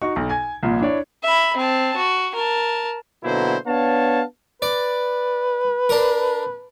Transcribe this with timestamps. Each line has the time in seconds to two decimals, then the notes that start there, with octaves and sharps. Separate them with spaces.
0.02 D#4 F#4 C#6
0.16 B1
0.29 G#5 G#6
0.63 C2 A#2 F3
0.80 D4 E4 C#5 D5
1.23 E5 B5
1.57 C4 A5
1.96 F#4
2.35 A#4 A5
3.24 B2 D3 F#3 A#3 E4 C5
3.67 B3 D4 C#5 F5 A5
4.62 B4 D5
5.89 D4 A#4